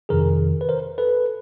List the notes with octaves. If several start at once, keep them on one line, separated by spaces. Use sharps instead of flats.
F2 C3 D#3 G#4 A#4
B4
A#4 C5
A4 B4